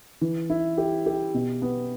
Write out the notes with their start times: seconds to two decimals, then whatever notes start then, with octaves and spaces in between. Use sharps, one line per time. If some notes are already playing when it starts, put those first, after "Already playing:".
0.21 E3
0.50 E4
0.78 G4
1.06 G4
1.34 B2
1.62 B3